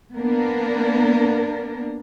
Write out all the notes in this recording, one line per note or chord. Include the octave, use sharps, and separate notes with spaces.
A#3 B3 D4 A#4